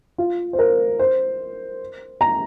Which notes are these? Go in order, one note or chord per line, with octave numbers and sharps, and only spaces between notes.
F4
C5
A#4
C5
A#5